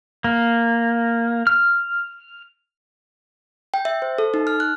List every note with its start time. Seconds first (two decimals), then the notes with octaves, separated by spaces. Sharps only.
0.24 A#3
1.47 F6
3.74 G5
3.85 E5
4.02 C5
4.18 A4
4.34 D#4
4.47 F6
4.60 F#6